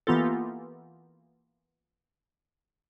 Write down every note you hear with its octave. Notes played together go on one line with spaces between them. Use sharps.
E3 A#3 B3 F4 G4 A4